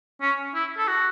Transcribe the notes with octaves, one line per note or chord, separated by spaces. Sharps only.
C#4
E4
A4
F#4